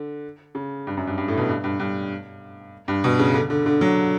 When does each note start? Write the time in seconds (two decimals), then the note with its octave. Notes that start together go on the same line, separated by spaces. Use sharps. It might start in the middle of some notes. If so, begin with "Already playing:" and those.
Already playing: D3
0.55 C#3
0.87 G2
0.97 F#2
1.07 G2
1.18 G2
1.28 A2
1.38 B2
1.49 G2
1.64 G2
1.80 G2
2.88 G2
3.04 B2
3.19 C#3
3.34 D3
3.50 D3
3.66 D3
3.81 F#3